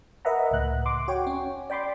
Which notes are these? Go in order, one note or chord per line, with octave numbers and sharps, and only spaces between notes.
A#4 B4 D#5 E5 F#5 A#5
C#2 A2 F#6
C6 D6
F#4 C#5 G5
C#4
D5 G5 B5 C6 D6